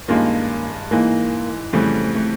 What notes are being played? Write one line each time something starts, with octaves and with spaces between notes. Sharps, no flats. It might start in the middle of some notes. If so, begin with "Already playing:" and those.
G2 D#3 G#3 A#3 C#4 F4
G#2 E3 G#3 A#3
F2 C#3 E3 G3 A3
A3